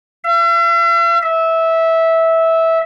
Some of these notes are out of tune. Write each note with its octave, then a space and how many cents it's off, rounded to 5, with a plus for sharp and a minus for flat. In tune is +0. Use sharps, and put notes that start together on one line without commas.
E5 +45
E5 -15